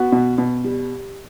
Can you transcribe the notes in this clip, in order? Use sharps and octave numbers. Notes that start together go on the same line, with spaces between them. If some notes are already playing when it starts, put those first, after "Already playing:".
Already playing: B3 F#4
B2
B2
G3